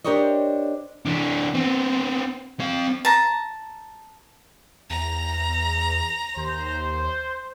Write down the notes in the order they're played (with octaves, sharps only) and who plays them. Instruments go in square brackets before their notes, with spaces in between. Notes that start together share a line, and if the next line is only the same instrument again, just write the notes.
[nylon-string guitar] D4 G4 A#4 C5 C#5 D#5
[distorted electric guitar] E3 D4
B3 C4
C4 F5
[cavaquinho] A5 A#5
[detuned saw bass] E2 [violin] A#5
[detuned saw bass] D#2 [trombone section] C5